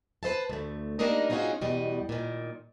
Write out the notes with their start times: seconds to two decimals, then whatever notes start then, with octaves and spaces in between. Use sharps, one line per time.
0.23 B4 C5 E5 A5
0.50 D2 A3
0.99 G3 A#3 D4 D#4 A#4 D#5
1.30 C4 C#4 D#4 F4 F#4 G#4
1.61 E2 B2 G3 D#5
2.09 A#2 D#3